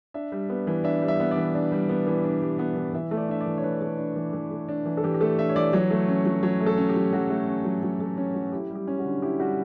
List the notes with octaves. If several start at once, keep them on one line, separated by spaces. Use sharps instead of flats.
D4 E5
G3
B3
E3
D4 E5
G3
E5
B3
D5
E3
D4
G3
B3
E3
D4
G3
B3
E3
E3 E5
A3
D5
D4 E5
D5
E3
C#5
E3 B4
A3
D4
E3
E3
A3
D4
E3
A4
E3 G4
G4
A3 A4
D4 E5
C#5
E3 D5
F#3 C#5
A3
C#4
F#3
F#3 C#5
A3
A4
C#4
G4
F#3
F#3 F#4
A3
C#4
F#3
F#3
A3
C#4
F#3
E4 G4
G3
G4
C#4
F#4
D3
E4 G4
G3 F#4